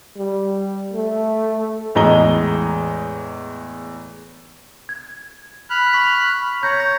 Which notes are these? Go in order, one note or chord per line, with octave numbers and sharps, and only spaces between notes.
G3
A3
E2 A2 G#3 D#5 A#5 G7
G#6
B5 F6 F#6
C#6 B6
C#5 A#5 G6
A#6